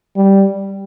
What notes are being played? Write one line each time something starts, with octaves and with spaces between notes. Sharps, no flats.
G3